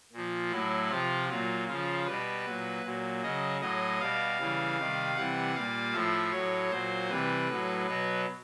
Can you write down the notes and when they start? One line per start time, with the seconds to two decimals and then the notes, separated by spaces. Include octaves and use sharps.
0.13 A#2 F3
0.52 A2 F#3 E4
0.90 C3 F3 F4
1.29 A#2 F#3 F4
1.68 C#3 F3 F4
2.06 B2 G3 B4
2.45 A#2 F#3
2.84 A#2 F#3
3.23 C#3 F#3 D#5
3.61 A2 F#3 D#5
4.00 B2 G3 F5
4.39 C#3 E3 G3
4.77 C3 D#3 G3
5.15 C3 E3 G3 F#5
5.55 A#2 G3 F5
5.93 A2 F3 E5
6.32 A2 F#3 C#5
6.71 A#2 F#3 C5
7.10 C3 E3 G3 B4
7.48 A2 F#3
7.87 B2 F#3 B4